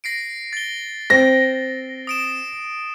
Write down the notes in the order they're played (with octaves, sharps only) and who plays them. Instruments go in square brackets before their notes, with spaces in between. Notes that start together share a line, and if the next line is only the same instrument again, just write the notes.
[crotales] A#6 C7 D7
A6 G7
[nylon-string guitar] C4 [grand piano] A#6
[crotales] D#6 D7 E7